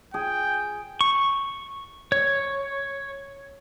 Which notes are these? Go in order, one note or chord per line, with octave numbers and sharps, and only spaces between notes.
G#4 G5
C#6
C#5